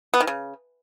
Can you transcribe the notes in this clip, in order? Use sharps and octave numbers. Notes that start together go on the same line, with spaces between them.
B3
D#3
C#3